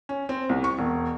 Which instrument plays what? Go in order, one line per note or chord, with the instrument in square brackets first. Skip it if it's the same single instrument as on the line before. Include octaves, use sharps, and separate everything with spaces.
[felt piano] C#4
C4
C2
C#6
E1